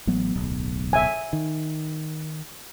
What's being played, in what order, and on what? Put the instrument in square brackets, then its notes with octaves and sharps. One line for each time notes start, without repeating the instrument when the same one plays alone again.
[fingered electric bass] A1 F#3 B3
D1 B1
[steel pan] E5 G#5
[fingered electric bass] D#3